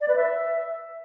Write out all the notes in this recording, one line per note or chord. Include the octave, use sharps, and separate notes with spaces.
D5
B4
E5